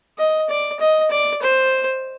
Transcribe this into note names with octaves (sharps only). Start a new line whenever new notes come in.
D#5
D5
D#5
D5
C5